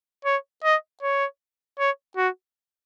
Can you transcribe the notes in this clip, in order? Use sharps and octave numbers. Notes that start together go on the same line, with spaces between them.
C#5
D#5
C#5
C#5
F#4